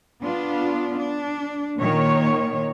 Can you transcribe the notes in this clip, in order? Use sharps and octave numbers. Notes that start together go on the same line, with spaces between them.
B3 D4 F4
D4
A#2 D#3 C#5